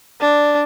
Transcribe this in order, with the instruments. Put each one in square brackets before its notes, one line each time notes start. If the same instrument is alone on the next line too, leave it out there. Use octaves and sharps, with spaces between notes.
[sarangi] D4